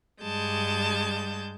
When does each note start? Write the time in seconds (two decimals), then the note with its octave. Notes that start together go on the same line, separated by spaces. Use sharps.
0.23 G2 G3 G#3 A5 G6